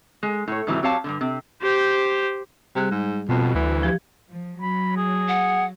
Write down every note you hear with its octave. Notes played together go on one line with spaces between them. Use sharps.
G#3
A2 C#5
G#2 C3 E3 F#3 G3 A3
F#3 C4 G4 C#5 F5 A5
G2 A#2 D3
C3
G4 C5
C3 G3 G#4 F#6
G#2
F2 B2
D2 E3
F3 G4 G#6
F3
F#3 B5
G#4
F#5